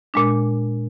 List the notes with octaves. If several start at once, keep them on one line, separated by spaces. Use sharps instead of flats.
A#2 G#3 D4